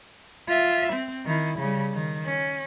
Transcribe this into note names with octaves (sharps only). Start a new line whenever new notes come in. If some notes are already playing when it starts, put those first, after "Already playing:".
F4 E5
C4
D#3 E4
C#3 G3
D#3
C#4